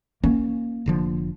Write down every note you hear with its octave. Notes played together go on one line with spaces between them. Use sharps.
A#3 C#4
F1 D3 F3